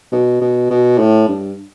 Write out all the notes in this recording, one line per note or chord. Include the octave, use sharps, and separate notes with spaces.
B2
B2
B2
A2
G2